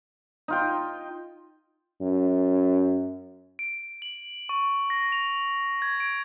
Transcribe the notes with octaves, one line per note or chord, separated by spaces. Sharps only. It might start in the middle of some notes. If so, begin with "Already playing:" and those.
D#4 F4 G5
F#2
D7
F#7
C#6
A#6
F7
G#6
D7